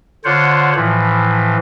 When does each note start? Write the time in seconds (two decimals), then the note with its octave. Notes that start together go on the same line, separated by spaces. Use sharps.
0.24 D3 F4 C5 C#5 F#5
0.76 A2 E3 F3